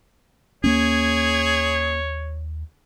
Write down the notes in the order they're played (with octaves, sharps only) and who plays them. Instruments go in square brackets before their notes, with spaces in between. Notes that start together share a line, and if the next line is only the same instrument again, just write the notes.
[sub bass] D#2 [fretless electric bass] A#3 C#4 [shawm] G#4 [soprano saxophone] C#5